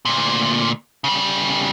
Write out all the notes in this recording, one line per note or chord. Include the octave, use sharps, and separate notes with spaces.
D2 A#2
C#3 G3